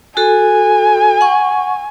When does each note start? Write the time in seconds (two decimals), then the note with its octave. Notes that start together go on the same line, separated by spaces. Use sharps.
0.17 F#4 A4 G#5
1.21 F#5 C#6